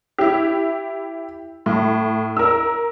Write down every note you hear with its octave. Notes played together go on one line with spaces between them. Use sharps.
E4 G4
A2
A#4 E6